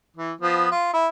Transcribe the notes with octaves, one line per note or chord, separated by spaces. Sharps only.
E3
F3 B3
F4
E4